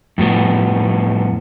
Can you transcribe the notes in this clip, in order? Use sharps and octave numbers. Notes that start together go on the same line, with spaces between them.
F2 A2 B3